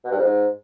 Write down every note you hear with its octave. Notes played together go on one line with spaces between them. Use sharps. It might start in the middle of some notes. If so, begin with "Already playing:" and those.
B2
G2
F2
G#2